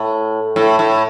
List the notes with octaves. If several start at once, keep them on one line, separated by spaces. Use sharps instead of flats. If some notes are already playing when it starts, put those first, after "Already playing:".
Already playing: A2
A2
A2